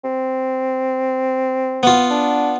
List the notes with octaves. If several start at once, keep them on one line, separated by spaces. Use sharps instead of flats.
C4
B3 F4
D4